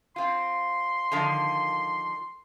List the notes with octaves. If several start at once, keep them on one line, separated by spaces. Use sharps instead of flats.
C4 F4 C6
D3 D#3 F3